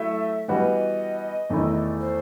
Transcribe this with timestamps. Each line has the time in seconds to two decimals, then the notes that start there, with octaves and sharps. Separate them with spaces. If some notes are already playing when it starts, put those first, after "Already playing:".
Already playing: F#3 A3 E4 E5
0.48 E3 G3 B3 F#4 D#5
1.50 E2 D#3 A3 E4
2.00 C5